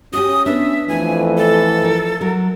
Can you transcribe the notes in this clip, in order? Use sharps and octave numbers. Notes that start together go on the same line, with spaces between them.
C#4 F#4 G4 D#6
B3 D4 E5
F2 E3 A3 G#5
A4
F3 A#4
F#3 A#4